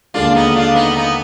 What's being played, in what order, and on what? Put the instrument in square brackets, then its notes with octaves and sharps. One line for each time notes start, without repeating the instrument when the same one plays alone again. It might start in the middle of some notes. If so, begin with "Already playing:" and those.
[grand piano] D#2 D3 G#3 [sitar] D4 F4
[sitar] D4
B3 D#4
D4 F4
B3 D#4
B3 D#4